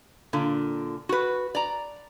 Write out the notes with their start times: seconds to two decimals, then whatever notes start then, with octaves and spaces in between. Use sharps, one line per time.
0.33 A#2 D3
1.09 F#4 B4
1.55 D5 A#5